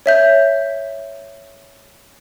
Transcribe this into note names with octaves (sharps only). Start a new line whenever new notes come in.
C#5 E5 G6